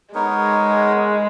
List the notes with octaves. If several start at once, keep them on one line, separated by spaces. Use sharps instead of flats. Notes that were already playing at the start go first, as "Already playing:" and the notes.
G#3 B3 D#4 A#4 C#5